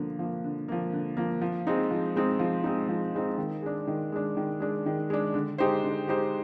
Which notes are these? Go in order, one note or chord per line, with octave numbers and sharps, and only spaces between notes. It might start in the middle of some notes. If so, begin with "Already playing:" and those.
Already playing: D3 F3 A#3
F3 A#3
D3
F3 A#3
D3
F3 A#3
F3
G#3 C4 D#4
F3
G#3 C4 D#4
F3
G#3 C4 D#4
F3
G#3 C4 D#4
D#3
G#3 D4
D#3
G#3 D4
D#3
G#3 D4
D#3
G#3 D4
D3
G#3 D#4 G4 C5
D3
G#3 D#4 G4 C5